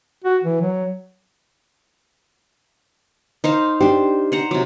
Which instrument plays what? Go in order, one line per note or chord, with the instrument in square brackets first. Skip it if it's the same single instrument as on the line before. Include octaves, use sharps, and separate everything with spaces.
[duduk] F#4
E3
F#3
[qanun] D#4 C5 F5
[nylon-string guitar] D4 G4 [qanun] C5
[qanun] C5 F#5 A#5
C3 F#3